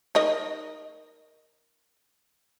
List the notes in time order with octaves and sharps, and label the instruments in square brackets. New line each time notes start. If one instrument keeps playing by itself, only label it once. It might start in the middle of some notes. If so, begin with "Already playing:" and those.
[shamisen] D#4 A#4 D#5